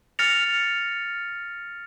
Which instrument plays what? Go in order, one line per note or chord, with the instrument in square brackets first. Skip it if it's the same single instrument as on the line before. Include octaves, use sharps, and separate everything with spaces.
[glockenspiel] F6 A6 A#6 C#7 F7